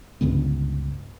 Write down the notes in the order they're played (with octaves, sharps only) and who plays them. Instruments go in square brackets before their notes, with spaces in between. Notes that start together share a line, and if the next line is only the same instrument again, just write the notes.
[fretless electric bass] C#2 G2 D3 B3